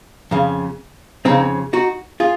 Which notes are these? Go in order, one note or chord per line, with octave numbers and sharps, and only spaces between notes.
F2 C#3
F2 C#3 C4 D#4
D#4 F#4
F4 G#4